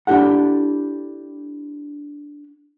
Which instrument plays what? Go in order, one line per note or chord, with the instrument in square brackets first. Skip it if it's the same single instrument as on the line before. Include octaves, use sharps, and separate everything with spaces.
[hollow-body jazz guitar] D4 E4 G4 A4 F#5